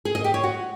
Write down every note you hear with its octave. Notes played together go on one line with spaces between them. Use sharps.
G#4
D#5
G4
C#5
F#4